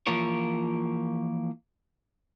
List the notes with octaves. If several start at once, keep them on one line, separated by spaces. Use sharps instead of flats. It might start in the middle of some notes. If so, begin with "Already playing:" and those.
E3 F3 A#3 F4 A#4 C#5